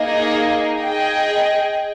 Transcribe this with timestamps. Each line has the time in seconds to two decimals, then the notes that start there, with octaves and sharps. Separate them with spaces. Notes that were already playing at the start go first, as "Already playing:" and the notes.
Already playing: A#3 D#4 G#4 D#5
0.82 G#4 D#5 G5